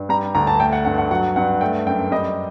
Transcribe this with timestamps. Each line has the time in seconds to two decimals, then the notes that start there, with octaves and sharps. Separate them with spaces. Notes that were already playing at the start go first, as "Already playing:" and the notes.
Already playing: G2
0.09 G3 A#5
0.35 D2 A#5
0.47 A5
0.59 A3 G5
0.73 F#5
0.85 G2 F#5
0.98 F#5
1.11 F#3 F#5
1.36 G2 F#5
1.61 A3 G5
1.86 F#2 G5
2.11 G3 D#5